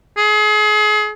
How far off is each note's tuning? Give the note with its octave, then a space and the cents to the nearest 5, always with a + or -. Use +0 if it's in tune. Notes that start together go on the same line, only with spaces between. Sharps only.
G#4 +35